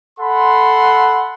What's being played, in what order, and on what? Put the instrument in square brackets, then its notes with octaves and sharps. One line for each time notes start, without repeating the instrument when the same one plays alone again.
[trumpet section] A4 F#5 B5 C6